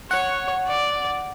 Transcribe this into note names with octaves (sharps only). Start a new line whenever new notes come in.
C#5 F#5
D5